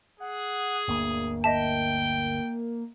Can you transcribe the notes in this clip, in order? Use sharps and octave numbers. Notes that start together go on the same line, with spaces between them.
G#4 F#5
G1 D2 A#3
D#5 E5 G5 A5